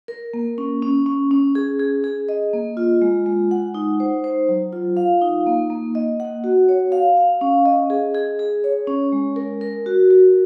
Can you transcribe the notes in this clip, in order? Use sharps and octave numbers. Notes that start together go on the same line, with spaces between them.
A#4
A#3
C#4
C#4
C#4
C#4
G#4
G#4
G#4
D#5
A#3
F4
G#3
G#3
F#5
D#4
C5
C5
F#3
F4
F5
D#4
A#3
A#3
D#5
F#5
F#4
C#5
F5
F5
C#4
D#5
G#4
G#4
G#4
C#5
C#4
G#3
A#4
A#4
F#4
F#4